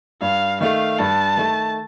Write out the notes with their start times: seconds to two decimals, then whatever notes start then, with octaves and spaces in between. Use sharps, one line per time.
0.21 G2 F5
0.60 D#3 A3 F5
0.99 G2 A5
1.37 D#3 A3